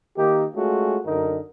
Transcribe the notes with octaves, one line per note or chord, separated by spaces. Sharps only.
D#3 A#3 D#4 G4
G#3 A3 C#4 F4 F#4
F#2 D3 D#4 A#4